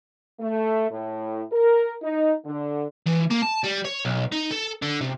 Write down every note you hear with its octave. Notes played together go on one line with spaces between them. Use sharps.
A3
A2
A#4
D#4
D3
E3
A#3
A5
G3
C#5
B1
D#4
A4
D3
C3